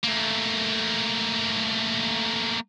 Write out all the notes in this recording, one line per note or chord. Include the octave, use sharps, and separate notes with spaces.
A3 A#3